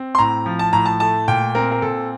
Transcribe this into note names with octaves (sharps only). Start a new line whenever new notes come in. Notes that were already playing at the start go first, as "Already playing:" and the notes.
Already playing: C4
C6
A2 A#5
F3
A5
A2 A#5
A5
A3 A5
A#2 G5
C4 A#4
A#4
A#2 A4